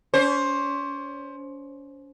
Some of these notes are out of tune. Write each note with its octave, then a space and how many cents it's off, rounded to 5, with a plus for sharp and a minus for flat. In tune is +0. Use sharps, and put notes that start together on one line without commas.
C#4 +35 C5 +15